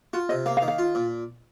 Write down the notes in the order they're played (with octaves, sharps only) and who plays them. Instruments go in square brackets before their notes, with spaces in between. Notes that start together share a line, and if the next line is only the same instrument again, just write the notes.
[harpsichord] F4 [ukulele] F#4
[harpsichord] C3 [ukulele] D#5
[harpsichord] A#3 [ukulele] F5
[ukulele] F5
[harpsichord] D#3
[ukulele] F5
[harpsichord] F4
A#2